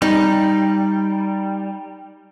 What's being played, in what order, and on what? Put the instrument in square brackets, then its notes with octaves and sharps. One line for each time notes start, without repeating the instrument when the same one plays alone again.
[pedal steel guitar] G3 [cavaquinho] D#4